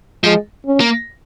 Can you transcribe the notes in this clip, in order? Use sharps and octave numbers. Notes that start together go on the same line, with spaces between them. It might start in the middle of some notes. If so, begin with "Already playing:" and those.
F3 G#3
C#4
A#3